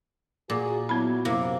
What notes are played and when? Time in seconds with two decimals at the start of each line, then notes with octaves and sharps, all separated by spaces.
0.50 A#2 F#4 G#4
0.89 F#3 B3 E4 B5
1.25 F#2 C3 A#3